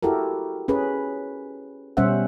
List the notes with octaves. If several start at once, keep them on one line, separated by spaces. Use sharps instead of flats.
E4 F#4 G4 A4 A#4
C#4 G#4 B4
B2 G3 C#4 C5 E5 F#5